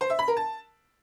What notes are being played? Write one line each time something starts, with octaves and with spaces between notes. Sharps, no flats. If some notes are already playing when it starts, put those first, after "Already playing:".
C5
E5
B5
A#4
A5